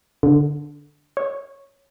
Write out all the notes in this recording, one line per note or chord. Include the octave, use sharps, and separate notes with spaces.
D3
C#5